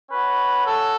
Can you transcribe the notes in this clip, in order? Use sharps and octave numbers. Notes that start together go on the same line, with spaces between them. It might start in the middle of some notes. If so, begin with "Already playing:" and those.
C#4 F#4 B4
A4